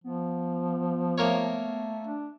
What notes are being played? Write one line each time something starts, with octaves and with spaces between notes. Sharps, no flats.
F3 B3
A3 A#3 A#4 C#5
D4